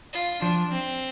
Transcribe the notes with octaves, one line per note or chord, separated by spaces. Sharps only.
F4
F3 D4
C4